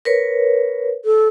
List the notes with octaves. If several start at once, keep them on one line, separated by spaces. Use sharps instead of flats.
A#4 B4 C#5
A4